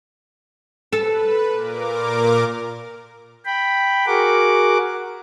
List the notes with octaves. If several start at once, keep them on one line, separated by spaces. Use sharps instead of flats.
A4 B4
A#2 A#4 D6
G5 B5
F#4 G#4 A#4 F#5 D6